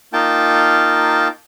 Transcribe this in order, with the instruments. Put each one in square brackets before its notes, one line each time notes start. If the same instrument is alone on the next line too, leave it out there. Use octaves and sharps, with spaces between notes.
[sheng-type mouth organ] A#3 D#4 F4 G5 A5